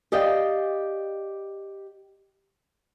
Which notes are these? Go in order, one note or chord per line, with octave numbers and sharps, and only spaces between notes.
G4 D5 D#5 F5 G5